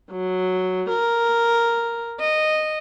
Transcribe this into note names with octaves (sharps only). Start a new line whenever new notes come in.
F#3
A#4
D#5